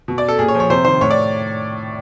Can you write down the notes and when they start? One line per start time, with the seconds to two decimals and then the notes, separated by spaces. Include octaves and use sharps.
0.08 B2
0.18 D5
0.28 A4
0.38 A#2 G#4
0.48 C#5
0.55 F3
0.60 C#5
0.70 C3 C5
0.85 D#3 C5
1.01 A2 C#5
1.10 D5